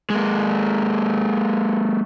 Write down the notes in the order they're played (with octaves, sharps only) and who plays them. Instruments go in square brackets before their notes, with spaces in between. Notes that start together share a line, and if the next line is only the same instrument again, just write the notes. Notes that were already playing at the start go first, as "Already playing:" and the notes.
[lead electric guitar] G#3 A#3